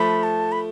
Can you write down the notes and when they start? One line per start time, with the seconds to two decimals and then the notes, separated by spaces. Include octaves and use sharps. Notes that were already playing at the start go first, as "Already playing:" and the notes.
Already playing: F3 A3 B5
0.23 A5
0.52 B5